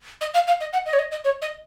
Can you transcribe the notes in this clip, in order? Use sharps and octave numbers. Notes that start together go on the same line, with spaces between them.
D#5
F5
F5
D#5
F#5
D#5
C#5
D#5
D#5
C#5
D#5